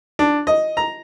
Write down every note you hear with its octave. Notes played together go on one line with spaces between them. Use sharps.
D4
D#5
A#5